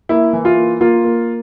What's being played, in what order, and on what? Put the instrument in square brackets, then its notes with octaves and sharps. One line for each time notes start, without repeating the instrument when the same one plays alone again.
[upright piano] A#3 E4
E3
F4
A#3
A#3 F4
A#3